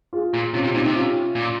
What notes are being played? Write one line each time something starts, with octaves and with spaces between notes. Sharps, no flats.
F4 G#4
A#2
C3 C#4 F4
C3
A#2 C4 D#4
C3
C#4 F4
A#2